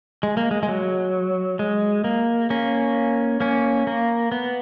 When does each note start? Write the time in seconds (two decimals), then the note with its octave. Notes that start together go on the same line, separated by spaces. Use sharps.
0.23 G#3
0.37 A#3
0.51 G#3
0.63 G#3
0.68 F#3
1.59 G#3
2.04 A#3
2.50 A#3 C#4
3.40 A#3 C#4
3.87 A#3
4.32 B3